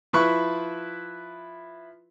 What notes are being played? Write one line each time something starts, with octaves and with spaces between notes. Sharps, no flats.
F3 E4 B4 C#6 F#6